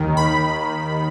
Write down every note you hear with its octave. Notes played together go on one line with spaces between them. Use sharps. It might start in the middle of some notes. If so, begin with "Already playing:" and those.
Already playing: D#2 D#3
B5